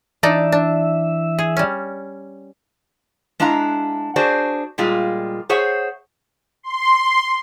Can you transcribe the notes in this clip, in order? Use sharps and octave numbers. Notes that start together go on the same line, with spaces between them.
E3 D4 D#4 D5 E5
D4
G#4
G3 C#4
G#3 D4 E4 F5 A#5
D4 F#4 G#4 C5 D5
A#2 G3 G#3 F4
G#4 C5 C#5 E5 F#5
C6